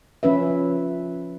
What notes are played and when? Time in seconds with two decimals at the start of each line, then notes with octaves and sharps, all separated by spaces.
0.23 F3 C#4 B4 E5